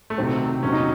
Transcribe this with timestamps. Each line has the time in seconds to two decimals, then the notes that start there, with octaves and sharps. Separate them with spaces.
0.10 A3
0.17 C2 C3 D#3 F#3 C4
0.63 E2 C3 D#3 F#3 C#4
0.72 D#4